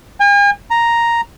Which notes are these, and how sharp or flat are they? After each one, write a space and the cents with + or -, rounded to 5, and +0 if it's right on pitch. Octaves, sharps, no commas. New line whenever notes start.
G#5 -45
A#5 +0